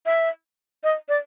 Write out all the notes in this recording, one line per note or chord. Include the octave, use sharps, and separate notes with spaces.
E5
D#5
D5